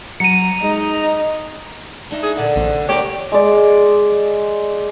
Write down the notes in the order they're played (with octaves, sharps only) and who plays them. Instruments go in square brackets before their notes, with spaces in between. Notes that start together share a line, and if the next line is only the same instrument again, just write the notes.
[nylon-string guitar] F#3 [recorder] A#5 [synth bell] C#7 D#7
[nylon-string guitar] G#3 [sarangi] D#4
[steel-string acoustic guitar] D4 D#4 E5
[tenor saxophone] G#4
[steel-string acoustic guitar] A#2 D5 G#5 [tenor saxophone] D3
[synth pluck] A#1 [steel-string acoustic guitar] C3
[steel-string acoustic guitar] A#3 D4 F#4 [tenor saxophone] G4 [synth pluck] C#5
[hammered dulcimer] G#3 D5